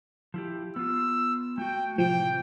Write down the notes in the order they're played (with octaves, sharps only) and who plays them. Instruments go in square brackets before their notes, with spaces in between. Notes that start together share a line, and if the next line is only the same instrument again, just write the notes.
[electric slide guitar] F3 E4 G4
[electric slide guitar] B3 F4 [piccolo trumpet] E6
[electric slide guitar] A3 F#4 [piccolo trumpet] G5
[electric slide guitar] A2 C3 E3 [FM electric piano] F3 [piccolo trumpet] G5